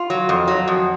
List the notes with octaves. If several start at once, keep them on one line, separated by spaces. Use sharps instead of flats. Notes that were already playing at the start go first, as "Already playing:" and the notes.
Already playing: F4
F#3
F2
F#3
F2